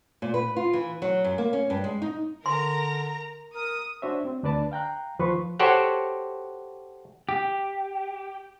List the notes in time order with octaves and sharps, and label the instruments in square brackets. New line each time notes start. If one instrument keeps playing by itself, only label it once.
[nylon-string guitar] A#2
B4
F4
E3
F#3
F#2
A#3
C#4
G2
G#3
D#4
[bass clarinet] D3 [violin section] A#4 A#5 [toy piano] C6
[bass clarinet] A#4 [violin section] D#6
[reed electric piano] D4 F#4 C5 C#5 E5
C4
D2 D4 B4 D5 A5
F5 G5 A#5 F#6
D#2 F3 B4 C6 C#6
[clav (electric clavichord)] F#4 G4 A4 C5 C#5 F#5
[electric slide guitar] G4